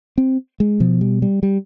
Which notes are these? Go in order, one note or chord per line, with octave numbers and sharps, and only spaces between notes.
C4
G#3
B2 F3
G3
G3
G3